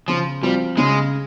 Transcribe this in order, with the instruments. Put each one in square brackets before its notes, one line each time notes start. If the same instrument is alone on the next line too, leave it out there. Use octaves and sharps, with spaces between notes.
[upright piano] C#3 [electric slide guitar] F3
[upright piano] F3 C4 F4 [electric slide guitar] G3
[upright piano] C#3 [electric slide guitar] G#3